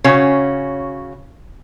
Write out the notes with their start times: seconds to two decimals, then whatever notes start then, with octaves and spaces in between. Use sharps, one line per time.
0.04 C#3 C#4 F#4